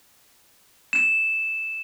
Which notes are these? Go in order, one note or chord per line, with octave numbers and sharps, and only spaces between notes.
E7